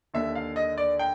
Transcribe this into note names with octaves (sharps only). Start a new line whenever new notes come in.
D#2 D3 E5
F5
D#5
D5
G5